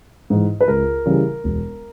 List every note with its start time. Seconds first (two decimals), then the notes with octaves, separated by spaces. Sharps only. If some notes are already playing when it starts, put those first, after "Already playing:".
0.30 G#2 E3
0.61 B4
0.68 C#2 A#4
1.06 C#3 E3 G3
1.44 E1